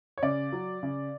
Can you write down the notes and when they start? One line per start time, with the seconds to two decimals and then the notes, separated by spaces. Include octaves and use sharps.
0.18 C#5
0.23 C#3 D5
0.53 F#3
0.83 C#3